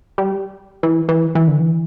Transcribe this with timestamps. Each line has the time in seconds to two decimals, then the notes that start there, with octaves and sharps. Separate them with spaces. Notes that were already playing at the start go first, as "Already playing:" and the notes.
0.18 G3
0.83 E3
1.09 E3
1.35 E3
1.48 D3
1.60 E3